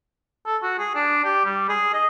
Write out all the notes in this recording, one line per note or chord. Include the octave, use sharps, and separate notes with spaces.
A4
F#4
G#4
D4
G4
G3
G#4
D#5